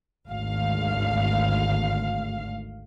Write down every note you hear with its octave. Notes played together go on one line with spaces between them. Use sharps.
G#1 D2 F5